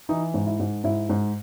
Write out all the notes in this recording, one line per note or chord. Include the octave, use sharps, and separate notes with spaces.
E3 D#4
G#2
E4
G#2
G#2 E4
G#2